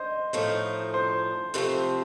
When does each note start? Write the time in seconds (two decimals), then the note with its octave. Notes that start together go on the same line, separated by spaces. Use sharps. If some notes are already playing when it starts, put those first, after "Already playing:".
Already playing: C5 D#5
0.33 A2 F3 A3 D#4
0.94 C5
1.54 F2 C3 F3 A3 C4